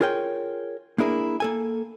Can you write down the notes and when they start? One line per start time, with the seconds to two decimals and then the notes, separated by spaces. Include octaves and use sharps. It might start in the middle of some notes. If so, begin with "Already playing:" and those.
0.01 F4 G#4 A#4 C#5 G5
0.98 A#3 D4 E4 G#4 A#4
1.40 A#3 A4 G#5